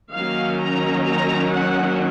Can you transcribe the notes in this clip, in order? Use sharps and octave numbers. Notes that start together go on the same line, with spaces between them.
D#3 F#3 A#3 C#4 F5
A#5
A#5
F#5